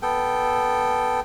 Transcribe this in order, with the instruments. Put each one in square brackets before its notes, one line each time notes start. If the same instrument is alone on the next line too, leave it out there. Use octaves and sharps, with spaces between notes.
[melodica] B3 A4 G5